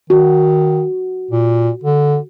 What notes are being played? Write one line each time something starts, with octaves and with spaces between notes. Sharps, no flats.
D#3 F#4
A#2
D3